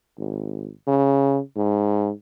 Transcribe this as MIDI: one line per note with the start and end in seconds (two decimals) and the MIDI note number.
0.18 0.70 32
0.87 1.40 49
1.56 2.11 44